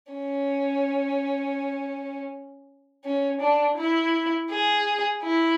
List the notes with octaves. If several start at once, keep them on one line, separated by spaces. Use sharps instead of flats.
C#4
C#4
D4
E4
G#4
E4